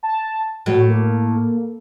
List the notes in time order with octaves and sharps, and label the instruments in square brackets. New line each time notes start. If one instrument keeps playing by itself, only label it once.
[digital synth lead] A5
[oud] A2 [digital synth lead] F#3
[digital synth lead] A#3